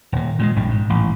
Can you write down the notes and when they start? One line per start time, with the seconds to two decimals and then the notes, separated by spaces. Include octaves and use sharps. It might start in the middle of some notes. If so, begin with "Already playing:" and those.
0.12 D#1 A#2
0.39 A#2 G3 G#3
0.56 A#1 G2 G3
0.70 G#2
0.90 A1 G#2